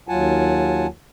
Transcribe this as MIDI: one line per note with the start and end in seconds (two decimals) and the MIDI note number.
0.09 0.87 39
0.09 0.87 54
0.09 0.87 65
0.09 0.87 78
0.09 0.87 80
0.09 0.87 81